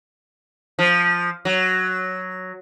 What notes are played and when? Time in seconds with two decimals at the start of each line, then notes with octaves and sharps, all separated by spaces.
0.79 F3
1.45 F#3